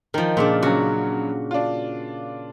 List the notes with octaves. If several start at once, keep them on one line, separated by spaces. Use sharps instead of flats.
D#3 F3 A#4
A#2 C#3 D4
C#3 F#3 F#4
D4 F4